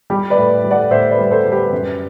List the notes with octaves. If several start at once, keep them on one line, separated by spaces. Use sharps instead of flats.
G3 G4
B4 D5
A2
G3
D5 F#5
A2 C5 E5
B4 D5
G3
A4 C5
G3
G4 B4
F#2